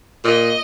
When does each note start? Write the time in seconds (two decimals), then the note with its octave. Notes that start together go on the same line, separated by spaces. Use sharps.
0.24 A#2 D#5